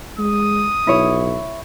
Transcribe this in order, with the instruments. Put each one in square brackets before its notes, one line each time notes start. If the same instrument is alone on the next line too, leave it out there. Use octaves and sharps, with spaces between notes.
[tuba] G#3 [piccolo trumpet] D#6
[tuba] B1 [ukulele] E4 C#5